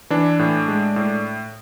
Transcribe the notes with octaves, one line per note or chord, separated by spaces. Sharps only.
E3 D4
A2
G#3
A2